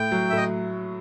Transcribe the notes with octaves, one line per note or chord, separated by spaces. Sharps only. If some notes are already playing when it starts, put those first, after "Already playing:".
Already playing: A2 G5
F#3
E5
A2 D#5